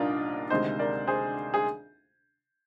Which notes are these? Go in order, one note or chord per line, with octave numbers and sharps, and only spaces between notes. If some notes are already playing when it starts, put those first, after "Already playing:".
Already playing: C2 A#2 D4 D#4 F4 A#4 D5
D2 C3 D#3 G#3 C5 D#5
A#4 D5
G#4 C5
G#4